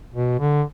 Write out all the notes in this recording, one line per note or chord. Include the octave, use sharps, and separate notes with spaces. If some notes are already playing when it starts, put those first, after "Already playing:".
B2
D3